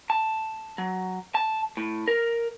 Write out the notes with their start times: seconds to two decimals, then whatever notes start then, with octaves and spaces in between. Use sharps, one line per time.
0.10 A5
0.78 F#3
1.35 A5
1.77 A2
2.08 A#4